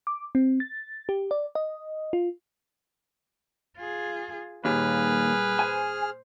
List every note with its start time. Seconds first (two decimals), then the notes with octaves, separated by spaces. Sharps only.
0.07 D6
0.35 C4
0.60 A6
1.09 G4
1.31 D5
1.55 D#5
2.13 F4
3.77 F4 G#4
4.65 D#2 A#2 G3 G#4 B4 F6
5.59 C5 G#5